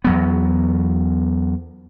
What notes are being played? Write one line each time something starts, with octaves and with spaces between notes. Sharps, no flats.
E2 F#3 B3